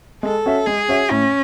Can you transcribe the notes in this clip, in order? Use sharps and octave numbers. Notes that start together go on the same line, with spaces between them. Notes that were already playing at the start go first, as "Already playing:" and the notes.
G#3 A4
C#4 F#4 C#5 E5
G#3 G#4
C#4 F#4 C#5 E5
A2 C#4